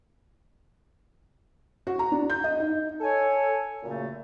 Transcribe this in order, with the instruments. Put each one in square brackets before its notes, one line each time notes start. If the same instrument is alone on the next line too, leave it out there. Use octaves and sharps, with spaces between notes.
[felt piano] F#4
A#5
D4
G6
D#5
D#4
[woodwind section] A4 C#5 G#5
F#2 A#2 C#3 A3 A#3